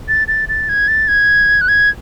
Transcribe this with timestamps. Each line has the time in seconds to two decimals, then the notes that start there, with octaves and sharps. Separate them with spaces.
0.08 A6
0.28 A6
0.49 A6
0.69 G#6
0.88 A6
1.08 G#6
1.61 F#6
1.68 G#6